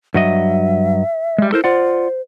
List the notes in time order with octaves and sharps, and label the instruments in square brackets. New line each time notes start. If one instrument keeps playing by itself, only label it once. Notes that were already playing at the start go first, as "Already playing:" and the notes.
[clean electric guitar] G2 F#3 D#5 [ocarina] E5
[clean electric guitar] G3 G#3
[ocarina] E4 [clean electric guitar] A4 A#4 C5
[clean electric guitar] F4 D5 F#5 [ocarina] C5